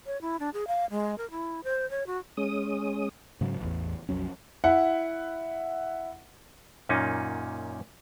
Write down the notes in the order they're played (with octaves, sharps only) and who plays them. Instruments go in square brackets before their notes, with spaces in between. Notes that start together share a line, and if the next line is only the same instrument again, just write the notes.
[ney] C#5
E4
D4
G#4
F5
G#3
A#4
E4
C5
C#5
F#4
[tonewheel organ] G#3 C#4 D#6
[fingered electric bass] G#2 C#3 F#3
A1 E2
B1 F2 F#3 C#4
[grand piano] E4 F#5
[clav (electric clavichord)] F#2 A#2 A#3 C#4 D#4